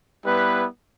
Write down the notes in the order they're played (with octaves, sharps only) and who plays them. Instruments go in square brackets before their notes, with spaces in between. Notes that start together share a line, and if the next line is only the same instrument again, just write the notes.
[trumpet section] G3 B3 E4 B4